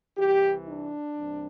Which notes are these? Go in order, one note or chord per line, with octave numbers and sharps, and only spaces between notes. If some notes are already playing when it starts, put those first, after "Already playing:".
C2 C3 E3 G4
D4
C2 C3 E3